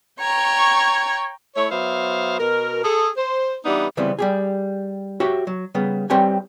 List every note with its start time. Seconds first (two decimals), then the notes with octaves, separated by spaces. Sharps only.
0.20 C#5 G5 A#5 C#6
1.56 A3 E4 C#5
1.71 F#3 B3 C5 E5 F5
2.40 B2 A#4
2.84 G#4 A4
3.17 C5
3.66 E3 G3 B3 D4 D#4
3.97 C#3 E3 G3 B3 C4
4.19 G3 G4 G#4
5.20 F#4 G4 C#5 E5
5.47 F#3
5.75 C#3 G3 B3
6.10 G3 C4 G4 B4 C#5 G#5